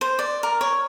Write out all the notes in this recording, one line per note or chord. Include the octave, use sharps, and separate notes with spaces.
C5
D5
A#4
C#5